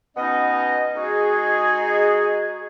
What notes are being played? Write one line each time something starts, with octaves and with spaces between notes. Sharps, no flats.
B2 B3 C#4 D#4 D#5
G#3 D#4 F#4 G#4